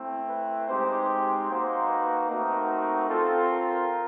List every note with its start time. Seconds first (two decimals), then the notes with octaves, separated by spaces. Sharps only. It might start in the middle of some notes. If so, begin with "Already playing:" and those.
Already playing: A3 C4 E4
0.28 B4
0.68 G#3 C4 D#4 G4 C5
1.09 C5
1.48 A#3 D#4 F#4 C5
1.89 B4
2.28 A3 C4 D#4 F#4 A#4
3.09 C4 F4 A4
3.49 A#4